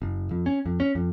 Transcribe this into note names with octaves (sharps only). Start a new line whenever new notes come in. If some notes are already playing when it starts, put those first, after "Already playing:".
F#1
F2
C#4
F2
C#4
F2